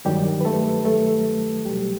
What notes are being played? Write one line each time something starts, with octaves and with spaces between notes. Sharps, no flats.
G2 D#3 F#3 G3 G4
B4
A3 A4
A3 A4
C2 B2 F#3 G3 G4